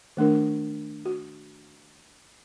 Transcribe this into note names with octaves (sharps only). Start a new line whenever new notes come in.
D#3 A3 D4 A#4
F#4